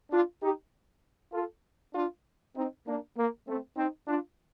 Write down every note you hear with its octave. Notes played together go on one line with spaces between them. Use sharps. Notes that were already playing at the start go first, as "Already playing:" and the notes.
D4 F4
D#4 G4
F4 A4
D4 F4
C4 D#4
A#3 D4
A#3
A3 C4
C4 D#4
D4 F4